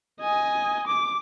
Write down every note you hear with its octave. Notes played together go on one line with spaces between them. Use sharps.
D#5 G#5
D6